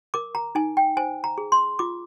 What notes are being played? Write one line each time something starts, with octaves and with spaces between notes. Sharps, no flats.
A#4 D6
A#5
D#4 G#5
G5
C5 G#5
A#5
G#4
C6
F4 D6